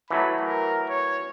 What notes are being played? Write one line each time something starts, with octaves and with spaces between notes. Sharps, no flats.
E3 F#3 A3 B5
A#4
C#5